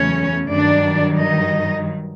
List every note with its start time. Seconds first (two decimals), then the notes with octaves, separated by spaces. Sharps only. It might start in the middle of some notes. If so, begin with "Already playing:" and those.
Already playing: E2 C#3 F#3 A3 C#4 C#5
0.49 G2 D#3 F#3 D4 D5
1.19 D#4 D#5